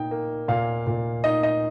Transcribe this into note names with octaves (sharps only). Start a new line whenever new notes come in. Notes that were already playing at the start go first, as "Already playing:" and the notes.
Already playing: A#2 D#4 G5
A#3
A#2 F5
A#2
D#4 D#5
D#5